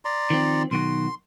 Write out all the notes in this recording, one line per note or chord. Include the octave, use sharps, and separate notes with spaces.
D5 A#5 C6
D#3 F3 C4
B1 D#3 F#4 C6